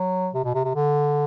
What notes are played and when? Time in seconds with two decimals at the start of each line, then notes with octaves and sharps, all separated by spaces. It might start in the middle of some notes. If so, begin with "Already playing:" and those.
Already playing: F#3
0.34 C3
0.44 B2
0.54 C3
0.64 C3
0.75 D3